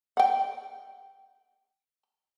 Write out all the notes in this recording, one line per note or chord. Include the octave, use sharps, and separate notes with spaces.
F#5 G5